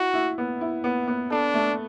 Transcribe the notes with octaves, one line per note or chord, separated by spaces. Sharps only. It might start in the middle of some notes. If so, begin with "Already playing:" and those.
Already playing: E4 F#4
E4
B3
E4
B3
B3
D4 A4
A3